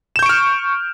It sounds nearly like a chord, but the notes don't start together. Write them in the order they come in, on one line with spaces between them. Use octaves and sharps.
E7 G6 C#6 D7 F6